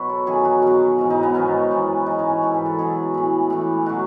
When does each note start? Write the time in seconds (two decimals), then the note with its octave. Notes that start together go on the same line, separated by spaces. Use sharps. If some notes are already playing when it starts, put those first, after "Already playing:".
Already playing: B2 F#3 B4 C#5
0.09 A4
0.26 F#2 D#3 F#3 G#4
0.45 F#4
0.62 B2 F#3
0.98 G#2 E3
1.10 D#4
1.23 B3
1.34 G#2 D#3 F#3 C#4
1.71 F#2 E3
2.06 G#2 E3 D#4
2.19 C#4
2.31 C#4
2.43 G#2 E3 A4
2.54 B4
2.66 A4
2.79 B2 F#3 G#4
3.14 A2 E3
3.50 A2 E3
3.86 B2 F#3 F#4